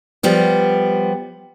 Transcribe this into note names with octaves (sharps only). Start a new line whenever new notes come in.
F3 G3 B3 G4